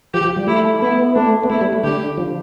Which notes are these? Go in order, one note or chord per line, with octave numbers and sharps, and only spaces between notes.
F3 G4
F3
G3
A3 E4
B3 E4
A3 D4
B3
A3 E4
G3
A3
D3 G4
F3